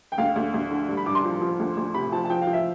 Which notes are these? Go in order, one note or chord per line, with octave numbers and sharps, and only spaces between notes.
G5
D2 F5
D2
D2
D3
G2
B5
G2 D6
C6
F3
F3
D2
D2
C3 B5
F3 A5
A5
F3 G5
F5
F3
E5